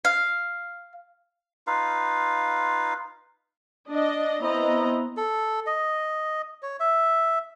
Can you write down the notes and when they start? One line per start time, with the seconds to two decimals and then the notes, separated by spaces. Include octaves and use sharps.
0.05 F5
1.67 D#4 F4 B4 F5
3.89 D4 D#5
4.42 B3 C4 E4 C5 D#5 A#5
5.17 A4
5.67 D#5
6.63 C#5
6.80 E5